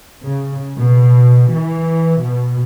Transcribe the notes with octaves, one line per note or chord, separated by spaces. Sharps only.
C#3
B2
E3
B2